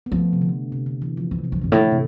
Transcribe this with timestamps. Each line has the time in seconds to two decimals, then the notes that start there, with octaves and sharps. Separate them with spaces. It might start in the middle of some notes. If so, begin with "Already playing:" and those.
0.06 B3
0.12 F3 A3
0.33 C3
0.41 D3
0.72 C3
0.86 D3
1.02 E3
1.17 F3
1.31 E3
1.44 C3
1.52 D3 F3
1.62 G2 E3
1.72 A2
1.92 C3